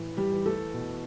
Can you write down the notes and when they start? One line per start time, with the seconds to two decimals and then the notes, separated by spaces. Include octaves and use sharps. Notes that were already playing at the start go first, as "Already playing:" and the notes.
Already playing: A2 E3
0.17 G3 G4
0.31 E3
0.46 A3 A4
0.74 B2